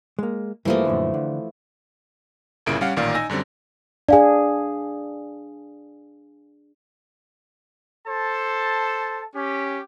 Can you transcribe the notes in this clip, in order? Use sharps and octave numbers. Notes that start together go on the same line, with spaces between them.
G#3 A#3
G2 E3 F3 G3 A3 A#3
F#2 A#2 D3
D3
G1 A#2 C#3 A#3 E4 D7
G3 C#4 F5 F#5
A1 A#2 D#3 D5 F5
D#4 G#5 E6 A#6
F#2 D3 G3 C4
D4 G#4 D5 F5 G#5
A4 C5 A5
C#4 G4